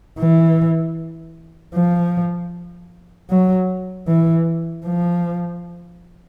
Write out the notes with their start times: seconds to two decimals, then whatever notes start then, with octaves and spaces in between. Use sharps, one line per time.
0.19 E3
1.74 F3
3.30 F#3
4.08 E3
4.85 F3